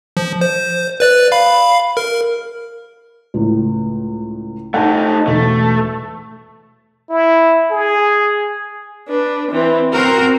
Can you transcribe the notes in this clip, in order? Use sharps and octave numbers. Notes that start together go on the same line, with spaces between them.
F3
C5
B4 D5 F#6
F5 B5
A#4
C#2 A2
A3 D#4 F#5 A5
E1 A3
E4
G#4
D4 B4
E3 C4
C4 F#4 A#4